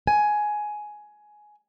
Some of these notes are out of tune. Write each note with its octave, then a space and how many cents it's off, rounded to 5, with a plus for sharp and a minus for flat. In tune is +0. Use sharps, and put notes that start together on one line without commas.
G#5 +10